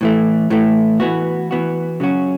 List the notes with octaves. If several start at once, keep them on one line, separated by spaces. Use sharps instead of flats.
A2 E3 A3
A2 E3 A3
E3 B3 F#4
E3 B3 F#4
C#3 F#3 C#4 F#4